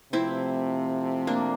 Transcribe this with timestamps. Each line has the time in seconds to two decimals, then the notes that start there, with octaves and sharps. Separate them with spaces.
0.13 C3 F3 A3 C4 E4
1.27 A#3 D4